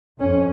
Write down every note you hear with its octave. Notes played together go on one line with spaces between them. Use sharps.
F2 C#4